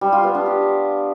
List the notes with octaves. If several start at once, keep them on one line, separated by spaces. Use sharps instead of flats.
G3
F4
B3
D4
G4